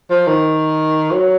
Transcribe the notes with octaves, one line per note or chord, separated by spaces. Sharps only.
F3
D#3
F#3